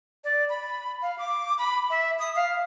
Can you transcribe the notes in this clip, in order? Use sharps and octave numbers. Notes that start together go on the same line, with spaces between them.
D5
B5
F5
D6
B5
E5
D#6
F5